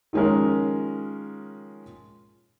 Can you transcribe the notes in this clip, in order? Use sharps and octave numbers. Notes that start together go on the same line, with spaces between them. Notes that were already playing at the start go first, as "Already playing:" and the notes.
D#3 F3 G#3 C#4 A#4